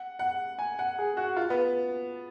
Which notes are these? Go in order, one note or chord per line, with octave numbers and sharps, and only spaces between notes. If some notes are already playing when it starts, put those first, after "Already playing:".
Already playing: F#5
F#5
G#5
F#5
G#4
F#4
F4
B3